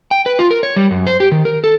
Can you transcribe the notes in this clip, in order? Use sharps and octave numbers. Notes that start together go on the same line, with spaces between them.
G5
B4
F4
A#4
C#5
G3
F#2
C5
G4
D#3
A#4
A4